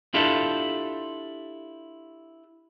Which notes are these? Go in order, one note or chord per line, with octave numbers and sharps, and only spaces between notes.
D4 E4 F4 G4 A4